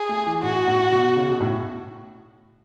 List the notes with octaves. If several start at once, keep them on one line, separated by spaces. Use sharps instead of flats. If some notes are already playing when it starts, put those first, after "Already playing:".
Already playing: G#4
A3
E3
A2 F#4
A2
B2
C#3
B2
A2